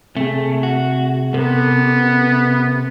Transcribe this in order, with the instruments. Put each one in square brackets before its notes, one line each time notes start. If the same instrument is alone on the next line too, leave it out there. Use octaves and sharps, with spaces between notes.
[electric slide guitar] C3 G#4 [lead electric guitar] A3
[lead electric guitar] F#4
[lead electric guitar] C3 [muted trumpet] B3 [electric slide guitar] A4 A#4